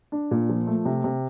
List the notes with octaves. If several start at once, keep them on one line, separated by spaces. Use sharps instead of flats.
D4
A#2
F3
A3
C3
C3